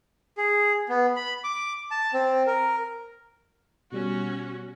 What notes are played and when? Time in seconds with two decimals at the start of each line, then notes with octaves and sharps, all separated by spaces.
0.38 G#4
0.89 B3
1.16 B5
1.44 D6
1.91 A5
2.13 C4
2.47 A#4
3.92 B2 G3 C#4 F#4